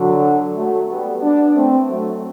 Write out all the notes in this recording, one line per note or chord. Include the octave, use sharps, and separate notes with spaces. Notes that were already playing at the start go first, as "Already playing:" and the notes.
Already playing: D3 F#3
F#3 A3
G3 B3
B3 D4
A3 C4
F#3 A3